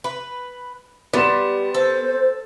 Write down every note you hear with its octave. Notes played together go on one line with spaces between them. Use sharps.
B4
G3 B3 C6 E7
A4 C5